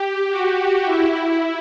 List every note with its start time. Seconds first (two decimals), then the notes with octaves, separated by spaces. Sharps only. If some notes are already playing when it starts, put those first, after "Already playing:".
Already playing: G4
0.30 F#4
0.85 E4